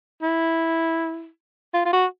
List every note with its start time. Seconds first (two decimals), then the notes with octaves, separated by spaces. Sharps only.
0.22 E4
1.74 F4
1.85 F4
1.93 F#4